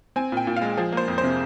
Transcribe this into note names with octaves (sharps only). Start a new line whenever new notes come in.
C4 G#5
A#2 G5
A#2
F5
G#3
F3 G#4
A#3 C5
F2
C5
C3